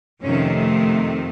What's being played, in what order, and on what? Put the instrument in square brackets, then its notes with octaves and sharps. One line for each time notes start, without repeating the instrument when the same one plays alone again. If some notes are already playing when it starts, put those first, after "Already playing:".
[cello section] F2 C3 D#3 A3 C#4